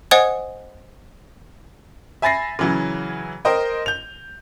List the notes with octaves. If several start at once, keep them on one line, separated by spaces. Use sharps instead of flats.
C5 D#5 F#5 G#5 D#6 G#6
E5 G#5 B5 A6 A#6 C7
C#3 E3 F#3
A#4 C5 D#5 G5
G6 F7